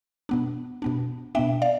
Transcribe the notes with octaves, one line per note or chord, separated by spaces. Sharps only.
B2 B3 D4
B2 B3 D4
B2 B3 D4 E5 G5
D5 F5